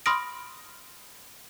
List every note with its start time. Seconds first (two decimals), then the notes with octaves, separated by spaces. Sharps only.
0.06 B5 C6 D#6 F6 A#6 D7